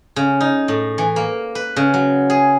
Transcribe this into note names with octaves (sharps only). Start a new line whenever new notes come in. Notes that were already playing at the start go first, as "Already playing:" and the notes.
C#3
D#4
A2
E3
A#3
B4
C#3
F#3
G#4